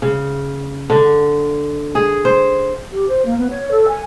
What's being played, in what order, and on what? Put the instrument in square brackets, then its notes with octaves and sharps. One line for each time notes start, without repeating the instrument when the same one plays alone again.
[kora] C#3
D3
G#4
C5
[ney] G4
C5
A#3
B3
C#5
A4
G#5